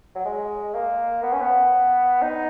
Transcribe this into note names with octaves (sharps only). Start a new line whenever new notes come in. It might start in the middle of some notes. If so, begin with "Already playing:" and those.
F#3
G#3
A#3
B3
C#4
B3
D#4